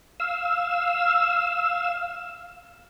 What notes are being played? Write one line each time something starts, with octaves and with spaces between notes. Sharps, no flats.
F5 E6